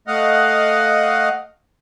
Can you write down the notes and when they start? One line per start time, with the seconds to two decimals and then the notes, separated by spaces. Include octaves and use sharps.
0.07 A3 D#5 F5 F#5